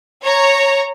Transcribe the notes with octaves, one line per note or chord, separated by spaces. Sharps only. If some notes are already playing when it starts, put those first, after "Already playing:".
C#5 A#5